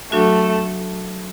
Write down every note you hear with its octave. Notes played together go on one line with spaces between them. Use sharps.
F#3 A3 D4 F#4